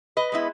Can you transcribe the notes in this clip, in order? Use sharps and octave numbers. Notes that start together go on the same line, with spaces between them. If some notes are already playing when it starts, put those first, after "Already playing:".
B4 D#5
G#3 B3 E4